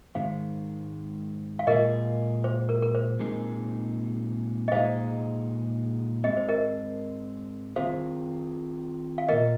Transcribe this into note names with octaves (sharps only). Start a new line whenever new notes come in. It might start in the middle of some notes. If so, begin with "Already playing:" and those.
G#2 D#3 G#3 C5 F5
F5
A#2 G#3 F4 G#4 A#4 D#5
C5
A#4
A#4
C5
A#2 G#3 C4 D#4 G#4
D#5
A#2 G#3 D#4 G#4 C5 F5
G#2 G#3 C4 D#5
C5
A#4 D#5
D#3 C4 F4 G#4 C5 F5
F5
A#2 A#3 F4 A#4 D#5